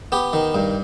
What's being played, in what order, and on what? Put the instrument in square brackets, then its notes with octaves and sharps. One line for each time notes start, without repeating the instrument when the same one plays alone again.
[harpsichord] B3 G4
D#3
G2